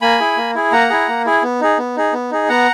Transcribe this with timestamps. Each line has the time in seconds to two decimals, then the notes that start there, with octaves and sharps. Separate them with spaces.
0.02 A#3 G#5 B5
0.20 E4 G#4
0.37 A#3
0.55 E4 G#4
0.72 A#3 F#5 A#5
0.90 E4 G#4
1.08 A#3
1.25 E4 G#4
1.43 B3
1.61 D#4 G#4
1.78 B3
1.97 D#4 G#4
2.13 B3
2.31 D#4 G#4
2.49 B3 F#5 A#5